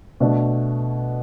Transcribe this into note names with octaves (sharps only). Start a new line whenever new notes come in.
B2 A3 D4